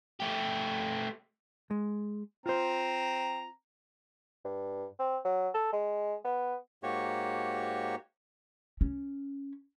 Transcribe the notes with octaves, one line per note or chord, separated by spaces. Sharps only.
A3 G4
G#3
C4 F4 C5 A#5
G2
C4
F#3
A4
G#3
B3
G#2 A#3 F#4 G4 C#5
C#4